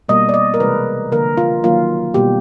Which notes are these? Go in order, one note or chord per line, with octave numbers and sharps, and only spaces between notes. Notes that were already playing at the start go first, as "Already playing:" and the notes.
B2 G3 A#3 D#5
D5
D#5
A#4
C3 E3 G#3 B4
D3 F3 A#3 A#4
F4
D#3 F#3 A#3 F4
B2 G3 A#3 G4